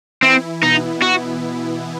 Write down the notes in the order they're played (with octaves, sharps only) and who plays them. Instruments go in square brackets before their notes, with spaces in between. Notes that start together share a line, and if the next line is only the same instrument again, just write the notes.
[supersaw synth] E3 E4 [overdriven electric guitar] C4
[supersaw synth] B2 B3 [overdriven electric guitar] D#4
[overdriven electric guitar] F#4